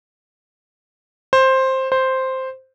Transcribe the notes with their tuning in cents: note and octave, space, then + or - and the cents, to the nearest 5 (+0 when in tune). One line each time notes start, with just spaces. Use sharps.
C5 +10
C5 +0